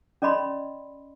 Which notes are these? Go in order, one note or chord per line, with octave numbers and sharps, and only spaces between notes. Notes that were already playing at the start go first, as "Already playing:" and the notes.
C#4 D5 D#5 B5 C6